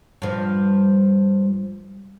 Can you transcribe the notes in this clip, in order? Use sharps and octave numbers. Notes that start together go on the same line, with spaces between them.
G2 F3